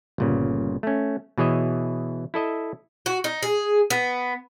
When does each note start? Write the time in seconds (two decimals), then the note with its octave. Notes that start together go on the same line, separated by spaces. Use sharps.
0.18 G1 A#2 C#3
0.83 A3 C#4
1.38 B2 E3 G#4 C#5 D#5 E5
2.34 E4 A4 D#5 E5
3.06 F#4
3.24 D#4
3.43 G#4
3.90 B3